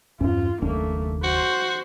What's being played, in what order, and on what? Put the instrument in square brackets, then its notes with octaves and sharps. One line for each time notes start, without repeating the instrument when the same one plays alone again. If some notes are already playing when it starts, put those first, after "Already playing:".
[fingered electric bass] E2 G2 C#4 [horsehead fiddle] F4
[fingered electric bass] F#1 D#2 D4 [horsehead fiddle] A3 A#3
[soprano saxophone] F#4 [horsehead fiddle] C5